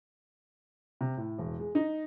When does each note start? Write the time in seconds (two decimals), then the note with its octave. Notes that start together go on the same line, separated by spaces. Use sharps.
1.01 C3
1.17 A2
1.38 E1
1.60 G#3
1.75 D#4